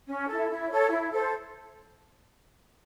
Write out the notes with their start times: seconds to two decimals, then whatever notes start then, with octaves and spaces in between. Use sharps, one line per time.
0.08 C#4
0.28 E4 A4
0.49 E4
0.69 A4 C#5
0.90 E4
1.11 A4 C5